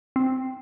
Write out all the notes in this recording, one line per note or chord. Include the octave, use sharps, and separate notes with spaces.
C4